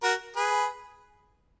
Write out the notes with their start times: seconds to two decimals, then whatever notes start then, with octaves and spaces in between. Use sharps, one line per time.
0.03 F#4 A#4
0.36 G#4 B4